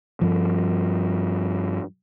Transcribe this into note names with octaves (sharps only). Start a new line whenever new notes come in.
G2 F3